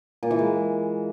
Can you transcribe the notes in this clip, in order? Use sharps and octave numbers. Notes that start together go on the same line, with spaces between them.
A#2
E3
G#3